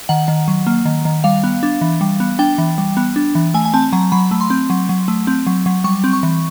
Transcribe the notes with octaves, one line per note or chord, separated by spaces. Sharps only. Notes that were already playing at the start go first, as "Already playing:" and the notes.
D#3 F#5
D#3
F#3
A#3
D#3
D#3
G3 F5
B3
D4
E3
G3
B3
D4 G5
E3
G3
B3
D4
E3
A3 G#5
G#5
C4 A5
F#3 A#5
F#3 B5
A3
C6
C4
F#3
F#3
A3
C4
F#3
F#3
G3 C#6
C4
C#6
E3